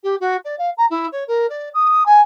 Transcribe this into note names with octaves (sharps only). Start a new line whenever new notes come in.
G4
F#4
D5
F5
A#5
E4
C#5
A#4
D5
D#6
G#5